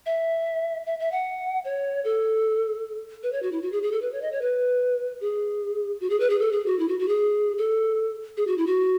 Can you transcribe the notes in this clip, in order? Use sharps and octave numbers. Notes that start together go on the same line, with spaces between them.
E5
E5
E5
F#5
C#5
A4
B4
C#5
F#4
E4
F#4
G#4
G#4
A4
B4
C#5
D#5
C#5
B4
G#4
F#4
G#4
B4
G#4
A4
G#4
F#4
E4
F#4
F#4
G#4
A4
G#4
F#4
E4
F#4